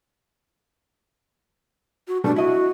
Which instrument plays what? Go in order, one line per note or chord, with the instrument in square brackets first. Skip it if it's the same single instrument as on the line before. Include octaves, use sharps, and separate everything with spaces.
[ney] F#4
[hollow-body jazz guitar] B2 G3 A3 [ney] D4
[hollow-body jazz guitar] E4 D#5 [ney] F#4